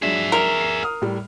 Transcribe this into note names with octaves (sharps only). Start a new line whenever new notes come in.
F#3 G#3 D4 G#4 E5
A#4
C7
D#6 F6
A2 G3